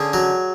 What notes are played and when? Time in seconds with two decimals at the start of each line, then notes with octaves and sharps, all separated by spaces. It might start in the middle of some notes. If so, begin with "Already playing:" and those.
Already playing: D3 C#4 G#4
0.13 F#3